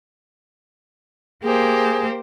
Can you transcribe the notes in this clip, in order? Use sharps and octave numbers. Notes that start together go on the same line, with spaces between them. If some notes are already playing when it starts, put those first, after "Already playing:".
A#3 G4 G#4 C5